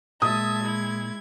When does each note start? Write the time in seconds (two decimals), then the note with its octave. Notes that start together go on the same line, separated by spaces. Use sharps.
0.22 A#2 G#3 E5 A5 D#6 G#6
0.63 E4